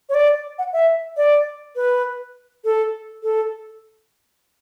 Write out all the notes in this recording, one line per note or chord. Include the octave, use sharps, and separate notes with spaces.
C#5
D5
F#5
E5
D5
B4
A4
A4